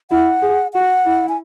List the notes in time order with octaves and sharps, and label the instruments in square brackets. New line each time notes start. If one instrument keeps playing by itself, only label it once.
[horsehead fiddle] E4 [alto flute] F#5
[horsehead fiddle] G#4
[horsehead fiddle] F#4 [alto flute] F#5
[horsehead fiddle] E4
[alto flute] G#5